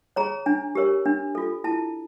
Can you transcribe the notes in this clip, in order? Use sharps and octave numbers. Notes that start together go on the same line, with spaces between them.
G#4 C#5 A#5
D4 G#5
G4 A#4 C#5
D4
F4 A4
E4 A5